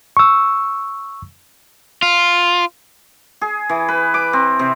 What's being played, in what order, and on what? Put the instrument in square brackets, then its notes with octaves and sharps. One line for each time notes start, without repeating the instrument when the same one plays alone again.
[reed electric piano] C#6 E6
[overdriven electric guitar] F4
[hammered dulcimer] G#4
E3
B4
D6
C4
C3